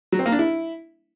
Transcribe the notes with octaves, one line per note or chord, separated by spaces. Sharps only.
F#3
C4
A#3
D4
E4